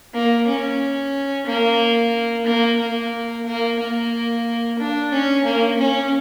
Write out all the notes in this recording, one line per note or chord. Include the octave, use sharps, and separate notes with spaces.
A#3
C#4
A#3
A#3
A#3
A#3
A#3
D4
C#4
A#3
C#4